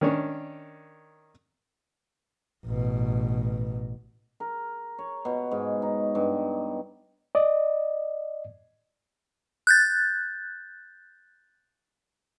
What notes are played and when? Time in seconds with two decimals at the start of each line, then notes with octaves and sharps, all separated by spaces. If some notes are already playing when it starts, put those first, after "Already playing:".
0.01 D#3 C#4 D4
2.66 A1 B2
4.40 A#4
4.99 C#5
5.25 B2
5.51 G#2
5.82 D#4
6.15 G2
7.35 D5 D#5
9.67 F#6 G6 A6